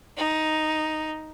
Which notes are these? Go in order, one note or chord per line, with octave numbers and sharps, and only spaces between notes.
D#4